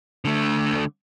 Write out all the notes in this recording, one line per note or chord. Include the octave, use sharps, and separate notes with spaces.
D3 A3